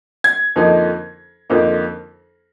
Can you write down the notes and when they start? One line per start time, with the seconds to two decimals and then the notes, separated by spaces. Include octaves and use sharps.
0.24 G#6
0.56 F2 D3 F3 A#3 D#4
1.50 F2 D3 F3 A#3 D#4